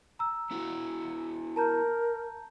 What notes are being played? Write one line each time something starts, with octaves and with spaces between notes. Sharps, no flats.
A#5 E6
B3 E4 F#4
A#4 A5 A#5 G6